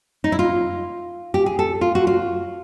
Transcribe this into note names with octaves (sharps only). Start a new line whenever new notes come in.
D#4
E4
F4
G4
G#4
A4
F4
F#4
F4